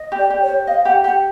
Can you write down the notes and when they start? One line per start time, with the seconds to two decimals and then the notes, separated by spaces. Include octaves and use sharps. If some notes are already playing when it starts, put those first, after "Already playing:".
Already playing: D#5
0.12 G4
0.18 D5
0.30 G4
0.43 C#5
0.48 C5
0.67 D#5 F5
0.85 G4 F#5
1.04 G4 F#5